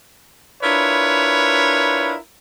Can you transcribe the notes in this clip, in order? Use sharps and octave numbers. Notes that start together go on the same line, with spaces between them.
D4 E4 F4 A#4 B4 C#5